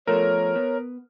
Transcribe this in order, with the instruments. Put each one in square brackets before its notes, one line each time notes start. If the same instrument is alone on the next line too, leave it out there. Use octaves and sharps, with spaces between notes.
[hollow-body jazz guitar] F3 A3 B3 [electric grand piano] A#4 [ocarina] C#5
[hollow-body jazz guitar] B3